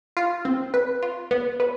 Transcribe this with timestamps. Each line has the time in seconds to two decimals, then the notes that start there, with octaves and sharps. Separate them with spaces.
0.17 F4
0.45 C4
0.74 B4
1.03 F4
1.31 B3
1.60 B4